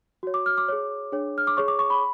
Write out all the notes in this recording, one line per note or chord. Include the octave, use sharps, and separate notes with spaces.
F#4 C#5
D6
F6
D6
G#4 C#5
D4 G#4 C#5
F6
D6
G#4 C#5 C#6
D6
C#6
B5